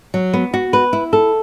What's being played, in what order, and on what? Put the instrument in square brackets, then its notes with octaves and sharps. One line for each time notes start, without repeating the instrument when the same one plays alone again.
[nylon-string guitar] F#3
B3
F#4
B4
E4
A4